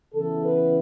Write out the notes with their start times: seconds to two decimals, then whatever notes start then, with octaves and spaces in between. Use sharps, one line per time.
0.14 C#3 E3 B3 E4 A4
0.45 B4